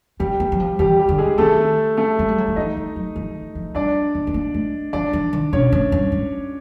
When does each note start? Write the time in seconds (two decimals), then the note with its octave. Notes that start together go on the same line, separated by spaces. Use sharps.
0.20 G3 C4 G4
0.40 B3
0.52 F#3
0.60 F3
0.79 E3 G3 G4
0.99 G3 G4
1.09 D3
1.18 G#3 G#4
1.38 D#3 A3 A4
1.97 A3 A4
2.19 G#3
2.28 G3
2.38 F#3
2.47 F3
2.56 E3 D#4 D#5
2.77 F3
2.96 F#3
3.16 F3
3.35 E3
3.55 F3
3.75 G3 D4 D5
4.15 B3
4.27 B3
4.34 A#3
4.54 A3
4.93 F3 D4 D5
5.13 E3
5.33 D#3
5.53 B2 C#4 C#5
5.72 A2
5.92 G2
6.12 G#2